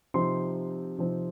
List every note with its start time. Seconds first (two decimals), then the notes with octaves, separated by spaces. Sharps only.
0.14 C3 F3 C4 D#4 C6
0.98 C3 F3 C4 D#4